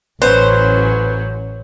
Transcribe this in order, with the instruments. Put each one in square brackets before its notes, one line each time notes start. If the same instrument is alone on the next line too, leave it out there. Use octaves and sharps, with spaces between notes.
[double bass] A1 [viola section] F#3 C#4 [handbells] B4 [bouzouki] C5